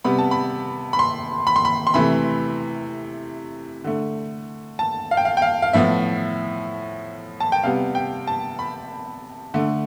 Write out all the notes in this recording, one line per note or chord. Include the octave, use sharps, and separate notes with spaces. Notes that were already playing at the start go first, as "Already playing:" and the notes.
C3 G3 B3 B5
A5
B5
B5
C6
B5
C6
B5
C6
C3 E3 A3 B5
D3 A3
A5
F5
G5
F5
G5
F5
F5
A2 F3 B3 E5
A5
G5
C3 G3 B3 F5
G5
A5
B5
D3 A3